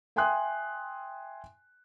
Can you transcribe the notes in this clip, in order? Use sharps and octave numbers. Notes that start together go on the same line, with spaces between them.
E5 G5 G#5 C6 D#6 F#6